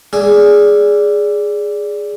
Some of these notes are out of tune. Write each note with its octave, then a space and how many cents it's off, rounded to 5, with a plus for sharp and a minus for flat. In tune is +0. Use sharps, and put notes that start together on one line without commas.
D4 -15 G#4 +0 E5 +30